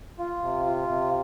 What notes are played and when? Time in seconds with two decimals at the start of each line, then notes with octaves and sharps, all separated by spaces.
0.19 F4
0.42 C3
0.65 F4
0.88 C3